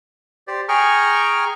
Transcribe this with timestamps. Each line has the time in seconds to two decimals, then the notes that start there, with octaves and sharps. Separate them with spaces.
0.48 G4 C5 D5
0.69 G#4 G5 G#5 A#5 C#6 F6